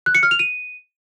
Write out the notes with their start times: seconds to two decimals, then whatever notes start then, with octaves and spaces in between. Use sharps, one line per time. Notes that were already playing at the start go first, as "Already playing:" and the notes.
0.06 F#6
0.15 C#7
0.23 F6
0.31 F7
0.39 D#7